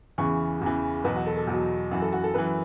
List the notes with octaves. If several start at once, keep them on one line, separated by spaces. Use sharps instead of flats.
E2 C#3 E3 C#6
E2 C#3 E3
E2 B2 F#3 B4
F#4
A4
A4
E2 B2 F#3
F#2 E3 F#4
A4
F#4
A4
F#2 E3 B4